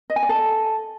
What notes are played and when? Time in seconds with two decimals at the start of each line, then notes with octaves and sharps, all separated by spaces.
0.10 D#5
0.16 G#5
0.23 D5
0.29 A4